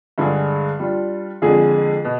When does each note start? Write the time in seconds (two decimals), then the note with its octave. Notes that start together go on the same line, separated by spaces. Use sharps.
0.18 G2 D3 G#3 D4 G#4
0.79 G3 D4 F4
1.42 F2 D3 G#3 D4 G#4
2.05 B2